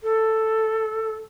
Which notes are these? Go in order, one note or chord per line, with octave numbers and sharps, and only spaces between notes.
A4